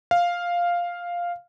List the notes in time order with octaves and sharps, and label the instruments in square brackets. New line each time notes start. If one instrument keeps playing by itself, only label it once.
[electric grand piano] F5